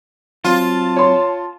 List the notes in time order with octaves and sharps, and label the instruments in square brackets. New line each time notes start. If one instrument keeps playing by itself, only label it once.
[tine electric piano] F#3 C4 [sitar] F4 [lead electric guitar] A5
[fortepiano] C#5 C6